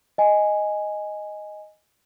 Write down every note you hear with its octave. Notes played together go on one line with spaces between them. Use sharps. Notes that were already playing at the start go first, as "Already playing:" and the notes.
D#5 G#5